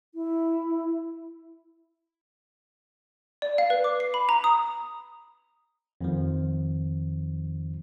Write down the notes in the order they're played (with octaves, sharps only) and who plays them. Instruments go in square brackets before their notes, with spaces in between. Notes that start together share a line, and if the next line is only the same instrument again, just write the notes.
[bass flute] E4
[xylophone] D5
F5
B4
D6
C7
B5
A#5
D#6
[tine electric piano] F2 D#3 F3